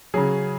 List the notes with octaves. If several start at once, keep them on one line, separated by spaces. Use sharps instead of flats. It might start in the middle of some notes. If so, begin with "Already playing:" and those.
C#3 F#3 G#4